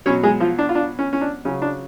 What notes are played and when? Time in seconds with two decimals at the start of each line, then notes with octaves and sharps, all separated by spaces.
0.06 B2 F#3 C#4 C#5
0.23 G#3 G#4
0.40 F3 F4
0.59 D4
0.69 F4
0.75 D4
0.99 C#4
1.13 C#4
1.21 D4
1.45 C#3 F#3 C#4
1.62 D4